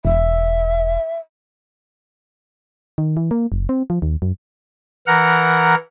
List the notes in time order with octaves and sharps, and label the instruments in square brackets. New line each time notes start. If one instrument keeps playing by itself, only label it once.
[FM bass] E1 [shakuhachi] E5
[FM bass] D#3
E3
A#3
F#1
C4
F3
D#2
F#2
[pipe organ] E3 A#4 F#5 A#5